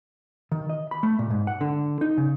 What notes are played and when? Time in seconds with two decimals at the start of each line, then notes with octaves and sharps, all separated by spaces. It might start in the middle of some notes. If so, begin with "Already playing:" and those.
0.52 D#3
0.70 D#5
0.91 B5
1.03 A3
1.19 A#2
1.30 G#2
1.47 F#5
1.61 D3
2.01 D#4
2.17 C#3